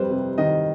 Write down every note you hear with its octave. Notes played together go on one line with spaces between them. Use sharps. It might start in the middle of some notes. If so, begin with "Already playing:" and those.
Already playing: F2 G3 B4 C5
C3
D#3 D#5